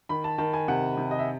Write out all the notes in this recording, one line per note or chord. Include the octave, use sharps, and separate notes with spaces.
D#3 B5
A5
D#3 A5
G#5
C3 F#5
C3
D#5
E5